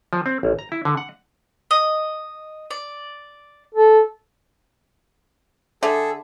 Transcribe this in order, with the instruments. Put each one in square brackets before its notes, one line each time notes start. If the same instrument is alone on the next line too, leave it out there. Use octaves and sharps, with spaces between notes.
[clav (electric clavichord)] F3
C4
A1
A#5
E4
D3
F#5
[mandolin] D#5
D5
[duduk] A4
[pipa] D3 [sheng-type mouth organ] G#4 A4 [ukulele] E5